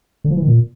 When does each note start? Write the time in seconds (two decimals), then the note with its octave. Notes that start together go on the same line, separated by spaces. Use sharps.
0.24 D3
0.30 F3
0.36 E3
0.42 D#3
0.48 A#2